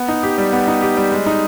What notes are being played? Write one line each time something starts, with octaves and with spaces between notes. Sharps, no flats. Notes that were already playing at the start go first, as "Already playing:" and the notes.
Already playing: B3
D#4
G4
G3
B3
D#4
G4
G3
G#3
D#4